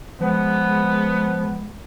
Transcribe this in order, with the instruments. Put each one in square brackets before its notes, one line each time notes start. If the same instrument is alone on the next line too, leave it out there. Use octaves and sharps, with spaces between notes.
[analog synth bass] F3 [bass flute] G#3 [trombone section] B3